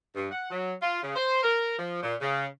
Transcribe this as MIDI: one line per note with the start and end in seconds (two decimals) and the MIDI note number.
0.15 0.31 43
0.32 0.50 78
0.51 0.73 54
0.81 1.01 65
1.02 1.14 49
1.16 1.42 72
1.43 1.77 70
1.79 2.00 53
2.02 2.15 46
2.21 2.45 49